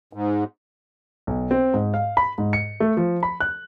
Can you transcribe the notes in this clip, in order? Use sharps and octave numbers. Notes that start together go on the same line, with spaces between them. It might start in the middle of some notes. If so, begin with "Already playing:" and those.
G#2
B1
C4
G#2
F5
B5
G#2
C#7
A3
F3
B5
F#6